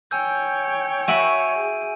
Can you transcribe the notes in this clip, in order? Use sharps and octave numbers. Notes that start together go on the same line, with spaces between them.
C#5 G5 G#5 E6 G6
F#4 E5 G#5 B5 D7 D#7
G#4